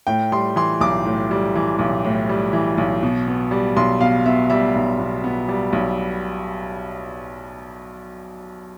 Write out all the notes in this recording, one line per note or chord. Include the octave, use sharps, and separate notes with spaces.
A2 G5
G3 C6
E3 C6
B1 D6
A2
G3
E3
B1
A2
G3
E3
B1
B2
B3
G3
B1 C6
B2 F5
B3 E5
G3 E5
B1
B2
B3
G3
B1